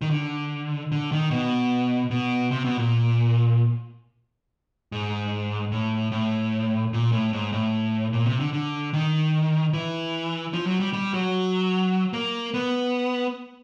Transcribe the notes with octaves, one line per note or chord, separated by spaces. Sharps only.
D#3
D3
D3
D#3
B2
B2
C3
B2
A#2
G#2
A2
A2
A#2
A2
G#2
A2
A#2
C3
D3
D3
D#3
E3
F3
F#3
G3
G3
F#3
A#3
B3